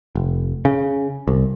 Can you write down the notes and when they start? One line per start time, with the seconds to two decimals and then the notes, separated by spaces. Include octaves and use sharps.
0.15 F1
0.65 C#3
1.28 C2